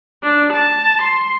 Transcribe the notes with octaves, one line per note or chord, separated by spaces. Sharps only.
D4
A5
C6